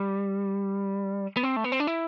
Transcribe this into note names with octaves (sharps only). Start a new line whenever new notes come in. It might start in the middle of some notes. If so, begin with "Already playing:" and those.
Already playing: G3
B3
C4
A3
B3
C4
D4
E4